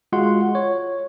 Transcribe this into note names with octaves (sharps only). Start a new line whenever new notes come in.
G#3 F4 F#4 F#5 C6
C#5